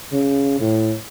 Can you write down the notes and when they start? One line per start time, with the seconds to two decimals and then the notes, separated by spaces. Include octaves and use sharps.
0.12 C#3
0.60 A2